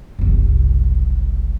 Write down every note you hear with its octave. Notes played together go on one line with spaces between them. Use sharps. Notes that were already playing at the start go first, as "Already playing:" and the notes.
F#1 C2